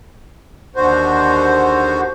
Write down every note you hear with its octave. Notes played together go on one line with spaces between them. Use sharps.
D#2 D3 F#4 C5